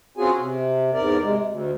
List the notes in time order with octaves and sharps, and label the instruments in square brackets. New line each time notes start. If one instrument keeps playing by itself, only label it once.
[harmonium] C4 C#4 F4 F#4 G#4 G#5
C3
E2 G#2 A#4 D5
C3 G#3
D2